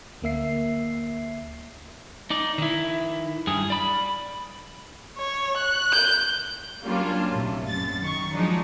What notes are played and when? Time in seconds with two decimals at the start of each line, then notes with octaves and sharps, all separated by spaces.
0.22 D2 A#3 E5 C7
2.30 D#4 D5
2.58 D#3 E4
3.47 G2 G#4
3.70 D5 B5
5.18 C#5
5.57 F#6
5.91 G6
6.84 F#3 G3 A#3 C#4 D4 F4
7.33 A#1 A2 C3
7.67 F#2 A6
8.01 D#3 C#6
8.32 F3 F#3 G#3 D4 D#4